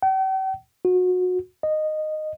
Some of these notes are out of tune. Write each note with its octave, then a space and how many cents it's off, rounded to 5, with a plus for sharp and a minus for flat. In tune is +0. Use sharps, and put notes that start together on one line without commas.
G5 -45
F#4 -25
D#5 -10